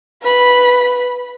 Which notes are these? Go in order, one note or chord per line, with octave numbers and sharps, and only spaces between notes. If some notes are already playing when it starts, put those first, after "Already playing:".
B4 B5